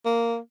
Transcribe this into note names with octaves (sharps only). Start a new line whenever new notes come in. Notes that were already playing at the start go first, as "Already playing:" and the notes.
A#3